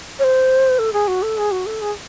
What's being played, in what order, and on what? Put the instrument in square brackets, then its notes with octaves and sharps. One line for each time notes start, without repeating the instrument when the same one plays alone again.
[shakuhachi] C#5
C5
A4
G#4
F#4
A4
G#4
F#4
A4
G#4